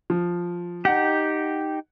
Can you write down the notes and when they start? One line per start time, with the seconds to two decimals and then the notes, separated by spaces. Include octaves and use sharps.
0.10 F3
0.85 D#4 G4 F#5